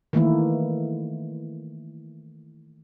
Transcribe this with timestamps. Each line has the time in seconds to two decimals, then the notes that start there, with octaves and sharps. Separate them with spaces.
0.13 D#3 E3 A3 A#3 E4